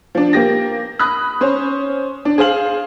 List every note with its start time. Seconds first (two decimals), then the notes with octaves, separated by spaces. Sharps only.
0.15 F3 D4
0.33 A#3 G4 A#6
0.99 B5 D#6 F#6
1.41 C#4 C5
2.25 D4
2.38 G#4 C5 F5 F#7